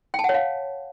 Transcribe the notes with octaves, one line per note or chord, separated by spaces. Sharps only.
G5
A5
F#5
C#5
F5